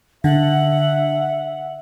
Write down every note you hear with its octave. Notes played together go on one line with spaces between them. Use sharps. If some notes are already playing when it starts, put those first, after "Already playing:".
D3 E5 F#5